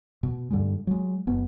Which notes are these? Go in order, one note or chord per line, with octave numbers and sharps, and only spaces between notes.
B2
G2 D3 G3 G#3
F#3 G#3
F#1 B3